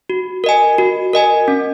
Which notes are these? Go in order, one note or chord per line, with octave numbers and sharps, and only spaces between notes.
F#4
A#4 D#5 G#5
F#4
A#4 D#5 G#5
C#4